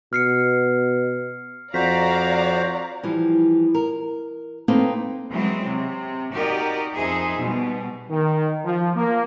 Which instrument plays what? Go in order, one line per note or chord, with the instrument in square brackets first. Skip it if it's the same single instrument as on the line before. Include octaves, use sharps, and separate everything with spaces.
[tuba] B2 [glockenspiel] F6 C7 C#7
[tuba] F2 [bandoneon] F#4 C5 [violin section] D5 F5 A#5 [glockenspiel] B6
[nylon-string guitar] E3 F3 G3
A#4
A#3 C4 D#4 A4 B4 G5
[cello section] E3 F#3 G#3 C4
C3
D#4 F#4 G4 A#4 D5 D#5
F2 D#4 G#4 C5 E5
B2 G3
[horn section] D#3
F3
A#3